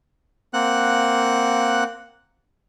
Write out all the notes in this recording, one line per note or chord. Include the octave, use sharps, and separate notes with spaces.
A#3 C4 F#5 F#6